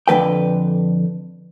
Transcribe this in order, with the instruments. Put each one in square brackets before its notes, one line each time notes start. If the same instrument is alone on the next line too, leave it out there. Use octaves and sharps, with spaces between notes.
[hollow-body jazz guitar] F2 D3 F#3 B4 G5